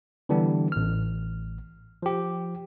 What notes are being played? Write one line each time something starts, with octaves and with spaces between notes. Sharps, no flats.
D3 E3 G3 B3 D4
A1 F6
F3 G4